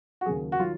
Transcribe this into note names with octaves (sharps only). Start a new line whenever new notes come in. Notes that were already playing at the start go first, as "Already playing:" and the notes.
F#4
D#2 C#3 F#3 G#4
F#4
D#3 F#3 F4